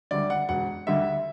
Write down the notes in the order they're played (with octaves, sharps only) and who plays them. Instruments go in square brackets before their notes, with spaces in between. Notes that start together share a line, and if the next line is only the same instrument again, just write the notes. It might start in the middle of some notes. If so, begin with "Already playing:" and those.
[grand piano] D2 D3 G3 D5
F#5
E1 F#5
D2 D3 G3 E5